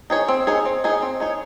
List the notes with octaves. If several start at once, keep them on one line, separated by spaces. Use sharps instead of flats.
D#4 G#4 C#5
C4
D#4 G#4 C#5
C4
D#4 G#4 C#5
C4
D#4 G#4 C#5